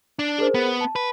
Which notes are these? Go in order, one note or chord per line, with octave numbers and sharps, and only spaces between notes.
D4
G#4 A#4 C5
B3
A5
B4